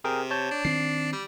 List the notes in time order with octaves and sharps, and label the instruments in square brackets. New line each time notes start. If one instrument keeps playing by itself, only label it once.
[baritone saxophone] C3 [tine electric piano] G#4 A#4 G5
[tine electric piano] C#5 A5 G6
[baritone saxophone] D4
[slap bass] D#3 C4 [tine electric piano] C7
[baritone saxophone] G3